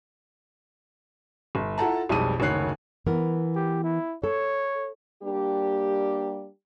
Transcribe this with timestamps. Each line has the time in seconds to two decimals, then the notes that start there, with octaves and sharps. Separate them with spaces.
1.55 G1
1.78 E4 F4 A4 F#5 A5 A#5
2.09 B1 F2 G3 G#3 D#7
2.40 F#1 D2 D#3 C#5 F#6 C7
3.06 E3 B3 A#4
3.55 G4
3.84 E4
4.24 A4 C#5
5.23 G3 A#3 D4 G4